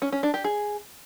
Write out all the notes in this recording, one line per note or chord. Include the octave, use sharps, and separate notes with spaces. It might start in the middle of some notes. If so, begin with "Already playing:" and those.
C#4
C#4
D4
G4
G#4